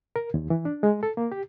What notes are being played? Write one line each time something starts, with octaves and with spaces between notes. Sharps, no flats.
A#4
D#2
E3
D4
G#3
A4
A#3
G4